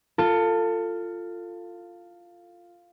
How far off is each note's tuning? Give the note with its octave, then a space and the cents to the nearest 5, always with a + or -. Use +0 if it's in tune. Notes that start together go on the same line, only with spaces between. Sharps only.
F4 +0 A4 +25